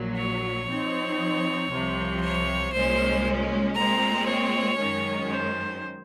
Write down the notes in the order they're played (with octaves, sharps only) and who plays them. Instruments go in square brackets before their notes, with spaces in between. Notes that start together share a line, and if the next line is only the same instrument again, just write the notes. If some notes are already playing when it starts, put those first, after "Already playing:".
Already playing: [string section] A#1 A#2 F#3
[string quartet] C#5
[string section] F3 C4 D#4
C2 C3 F3
[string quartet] C#5
[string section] C2 A#2 G#3 C#4 [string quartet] C5
[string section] A#2 G#3 C4 [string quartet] A#5
[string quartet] C#5
[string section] F#2 D#3 G#3 C#4
[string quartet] C5